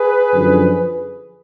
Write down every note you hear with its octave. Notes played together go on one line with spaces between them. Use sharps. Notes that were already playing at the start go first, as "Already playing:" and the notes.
Already playing: G#4 B4
F#2 D3 F3